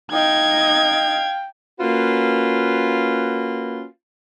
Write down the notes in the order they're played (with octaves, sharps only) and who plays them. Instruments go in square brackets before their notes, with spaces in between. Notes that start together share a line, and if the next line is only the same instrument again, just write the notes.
[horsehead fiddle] D#4 D#5 [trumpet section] F5 G5 [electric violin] G#6
[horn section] A#3 C#4 F4 F#4 B4